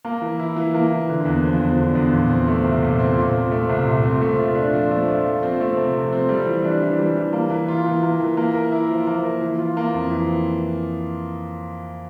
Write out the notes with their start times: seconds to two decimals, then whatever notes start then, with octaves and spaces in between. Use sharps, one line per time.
0.05 A#3
0.22 E3
0.39 E4
0.56 E3
0.74 A#3
0.92 E3
1.09 D3
1.25 E2
1.43 F3
1.60 E2
1.79 D3
1.95 E2
2.13 A#2
2.30 C4
2.47 A3
2.64 C2
2.83 A#2
2.99 C4
3.17 A#2
3.35 C4
3.51 A3
3.69 C2
3.87 A#2
4.04 C4
4.22 A3
4.39 F4
4.55 D4
4.73 F3
4.91 A3
5.08 F4
5.25 F3
5.43 C4
5.60 A3
5.77 C3
5.94 F3
6.12 C4
6.29 G3
6.46 E3
6.64 D4
6.82 E3
6.99 G3
7.16 E3
7.33 A#3
7.50 E3
7.68 F4
7.86 E3
8.03 A#3
8.20 E3
8.37 A#3
8.54 A#4
8.72 E4
8.89 F3
9.07 A#3
9.24 A#4
9.42 E3
9.58 F4
9.77 A#3
9.94 F2
10.11 E3